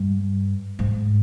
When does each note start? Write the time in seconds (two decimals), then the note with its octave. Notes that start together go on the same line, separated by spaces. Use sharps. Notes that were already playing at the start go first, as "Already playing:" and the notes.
Already playing: G2
0.79 G#2